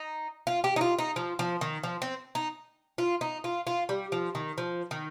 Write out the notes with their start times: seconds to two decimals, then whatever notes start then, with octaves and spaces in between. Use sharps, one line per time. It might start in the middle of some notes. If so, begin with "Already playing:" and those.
Already playing: D#4
0.47 F4
0.64 G4
0.76 D#4
0.81 F4
0.99 D#4
1.16 F3
1.39 F3
1.61 D#3
1.84 F3
2.02 C4
2.35 D#4
2.98 F4
3.21 D#4
3.44 F4
3.67 F4
3.89 G3
4.12 F3
4.35 D#3
4.58 F3
4.91 D#3